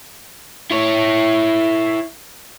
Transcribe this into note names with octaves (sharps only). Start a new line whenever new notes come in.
E4 C#5